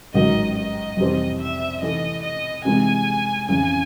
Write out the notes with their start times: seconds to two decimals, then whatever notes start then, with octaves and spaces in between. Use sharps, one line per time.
0.14 A1 G#2 D#3 F#3 D#5
0.56 D#5
0.97 F2 C3 E3 G3 C4
1.39 E5
1.81 C3 E3 A3 D#5
2.23 D#5
2.65 C3 E3 G#3 G#5
3.48 F2 C#3 E3 G#5